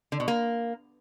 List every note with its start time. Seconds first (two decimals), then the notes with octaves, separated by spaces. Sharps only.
0.12 D3
0.20 B2
0.28 A#3